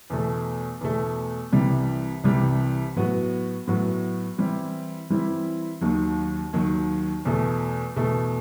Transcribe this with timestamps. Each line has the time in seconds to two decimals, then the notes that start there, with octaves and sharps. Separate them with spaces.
0.10 E2 B2 A3
0.81 E2 B2 A3
1.52 C2 C3 E3 G3
2.24 C2 C3 E3 G3
2.96 A2 F#3 B3 F#4
3.67 A2 F#3 B3 F#4
4.38 E3 G3 C4 E4
5.10 E3 G3 C4 E4
5.81 D#2 D#3 F#3
6.53 D#2 D#3 F#3
7.25 E2 B2 A3
7.96 E2 B2 A3